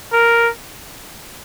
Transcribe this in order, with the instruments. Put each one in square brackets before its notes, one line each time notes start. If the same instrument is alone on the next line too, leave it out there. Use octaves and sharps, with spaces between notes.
[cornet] A#4